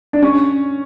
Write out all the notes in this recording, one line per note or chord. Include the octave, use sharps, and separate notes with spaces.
D4
C#4